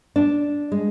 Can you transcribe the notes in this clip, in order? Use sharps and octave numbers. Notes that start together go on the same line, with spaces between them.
D4
G#3